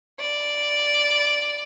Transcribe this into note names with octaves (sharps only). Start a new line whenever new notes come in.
D5